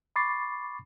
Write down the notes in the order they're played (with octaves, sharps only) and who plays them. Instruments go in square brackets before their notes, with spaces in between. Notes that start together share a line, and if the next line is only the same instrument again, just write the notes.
[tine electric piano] B5 C#6 D6 A6 C7